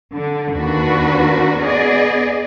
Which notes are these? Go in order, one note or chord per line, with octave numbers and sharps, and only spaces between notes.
D3
D#2 D4 F#4 B4
B3 G#4 D5 D#5